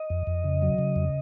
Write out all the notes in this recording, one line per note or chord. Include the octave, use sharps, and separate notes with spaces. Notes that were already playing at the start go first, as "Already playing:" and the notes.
Already playing: D#5
F2
F2
C#3
F#3
C#3
F2